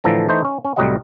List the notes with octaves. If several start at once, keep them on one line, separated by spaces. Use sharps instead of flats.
A2 D3 E3 F3 A4 A#5
E3 A3 D#4 C5
C#4
C#4
C2 A2 F#3 G3 D#5 F#5